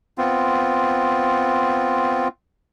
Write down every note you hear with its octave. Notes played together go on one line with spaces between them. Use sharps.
B3 C4 F4